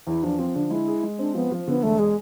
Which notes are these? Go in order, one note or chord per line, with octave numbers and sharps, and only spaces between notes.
E2 E4
F3 D4
F3 C4
D3 D4
G#3 E4
G#4
G#3
C4 D4
F3 B3
F3
D3 B3
E1 A3
G#3 G#4